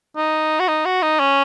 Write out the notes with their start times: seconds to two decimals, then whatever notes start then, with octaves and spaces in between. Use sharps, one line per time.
0.17 D#4
0.59 F#4
0.68 D#4
0.85 F#4
1.02 D#4
1.20 C#4